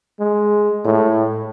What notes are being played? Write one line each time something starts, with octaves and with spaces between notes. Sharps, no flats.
G#3
A2